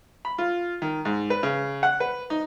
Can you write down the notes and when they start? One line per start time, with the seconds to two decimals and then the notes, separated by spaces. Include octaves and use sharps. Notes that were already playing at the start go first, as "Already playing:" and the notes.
0.25 B5
0.38 F4
0.82 D#3
1.05 G#2
1.30 B4
1.43 C#3
1.83 F#5
2.00 B4
2.30 D#4